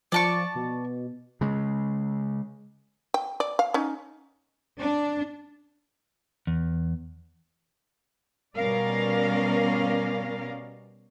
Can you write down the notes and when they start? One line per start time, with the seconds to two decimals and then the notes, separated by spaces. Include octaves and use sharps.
0.12 F3 D5 A5 C#6
0.55 B2
1.41 C#3 G#3
3.14 G5
3.40 D5
3.59 F5
3.74 C#4 D#4
4.78 D4
6.47 E2
8.57 B2 G3 C#4 A#4 D5 F5